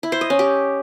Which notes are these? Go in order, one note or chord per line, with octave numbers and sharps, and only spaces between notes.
E4
C5
D#5
C#4
G4